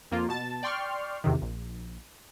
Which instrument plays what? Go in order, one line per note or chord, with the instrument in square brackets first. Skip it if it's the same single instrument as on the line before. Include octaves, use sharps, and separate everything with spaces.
[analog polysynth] F2 A#3 F4
B2 A5 A6
D5 G5 C6 C#6 F6
A1 E2 C3 D#3
A#1